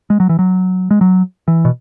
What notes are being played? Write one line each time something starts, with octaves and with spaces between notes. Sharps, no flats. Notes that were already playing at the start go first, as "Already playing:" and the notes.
G#3
F#3
E3
F#3
G#3
F#3
E3
B2